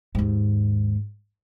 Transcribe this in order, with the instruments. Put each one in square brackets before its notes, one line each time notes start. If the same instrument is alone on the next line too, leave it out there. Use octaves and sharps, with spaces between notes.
[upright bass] D#2 G#2